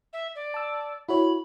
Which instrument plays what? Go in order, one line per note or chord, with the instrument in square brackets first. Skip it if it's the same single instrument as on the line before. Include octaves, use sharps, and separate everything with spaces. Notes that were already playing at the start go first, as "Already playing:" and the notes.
[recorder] E5
D5
[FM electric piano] A5 E6
[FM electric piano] E4 F#4 C#5 [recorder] B5